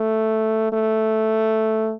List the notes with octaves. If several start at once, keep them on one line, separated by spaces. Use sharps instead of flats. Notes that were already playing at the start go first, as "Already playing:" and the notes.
Already playing: A3
A3